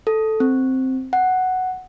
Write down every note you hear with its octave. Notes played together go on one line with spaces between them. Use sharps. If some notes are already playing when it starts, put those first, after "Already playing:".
A4
C4
F#5